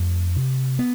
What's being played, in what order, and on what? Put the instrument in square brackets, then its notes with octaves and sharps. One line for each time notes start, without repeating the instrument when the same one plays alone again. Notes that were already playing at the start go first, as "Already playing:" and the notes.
Already playing: [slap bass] F2 A3
C3
B3